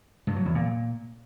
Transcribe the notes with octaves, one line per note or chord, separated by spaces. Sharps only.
G2
F#3
E2
A#2